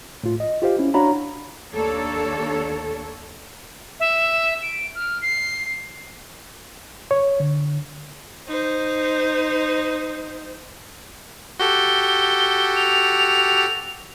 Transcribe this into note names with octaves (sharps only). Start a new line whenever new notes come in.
A2 F4
D#5
F4 G4 C5 F5
C#4 E4
D4 F#4 C#5 F5 A#5 B5
D#2 A#3 D4 A4 C#5
E5
D7
F6
C7
C#5
D3
D#4 C5
F#4 G4 A4 G7
F7